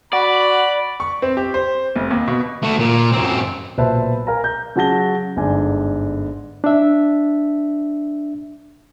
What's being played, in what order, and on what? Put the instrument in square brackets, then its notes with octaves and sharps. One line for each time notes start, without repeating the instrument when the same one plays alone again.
[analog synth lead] F#4 [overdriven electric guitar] D5 [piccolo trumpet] B5
[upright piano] C#6
C4
G4
C5
F1
D#2
B2
[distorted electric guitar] A3 F#4
A#2
F#2 C4
[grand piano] B1 A#2 B4 C5 E5 A5
A#4 F5 G#5 A#5
G6
C#3 F#3 F#4 A5 A#6 G7
G1 G#2 D3 D4 G#5
[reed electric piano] D4 E5